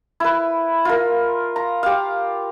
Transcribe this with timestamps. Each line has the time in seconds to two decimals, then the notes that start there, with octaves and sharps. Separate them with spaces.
0.20 E4 B4
0.85 F4 A#4
1.56 A#5
1.83 G4 F5